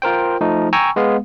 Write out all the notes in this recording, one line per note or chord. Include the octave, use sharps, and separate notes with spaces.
F4 A#4 C5 G5
F3 A3 D#4
G5 G#5 A#5 C#6 E6
G#3 B3 F5